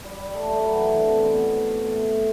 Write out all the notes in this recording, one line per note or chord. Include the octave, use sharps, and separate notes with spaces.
G3
G3
A3
G3
F#3
E3
E3
D3
C3
B2
A2